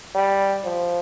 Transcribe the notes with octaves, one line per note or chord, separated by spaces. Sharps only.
G3
F3